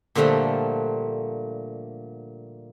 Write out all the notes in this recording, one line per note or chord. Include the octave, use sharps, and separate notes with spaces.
A#2 D3 F3 G3 A3